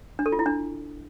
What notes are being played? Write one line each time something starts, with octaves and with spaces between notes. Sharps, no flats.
D4
A4
F4
E4
D4